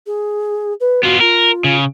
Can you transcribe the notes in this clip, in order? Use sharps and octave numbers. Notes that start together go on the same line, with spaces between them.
G#4
B4
B3 F4 F#4
F4 A#4
C#3